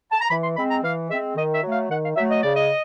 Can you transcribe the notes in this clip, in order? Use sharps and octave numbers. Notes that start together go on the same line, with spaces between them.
A5
A#5
E3 B5
C6
G#3 C4 B5
A#5
E3 F5
G#3 C4 E5
D#3 D#5
E5
F#3 A3
F5
D#3 F#5
F5
F#3 A3 E5
D#5
C#3 D5
D#5